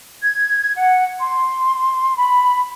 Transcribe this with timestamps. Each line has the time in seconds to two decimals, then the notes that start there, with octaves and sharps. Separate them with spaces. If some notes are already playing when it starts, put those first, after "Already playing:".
0.22 G#6
0.75 F#5
1.21 C6
2.17 B5